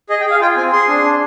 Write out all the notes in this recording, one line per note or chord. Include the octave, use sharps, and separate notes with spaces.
G#4 D#5
G5
G#4 F5
F4 G5
C4 G#5
G#4 C6
D4
D4